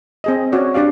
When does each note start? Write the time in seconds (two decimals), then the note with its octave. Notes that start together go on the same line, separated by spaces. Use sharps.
0.24 C4 G#4 D#5
0.52 C#4 F#4 C#5 D5
0.74 D4 G4 D5 F5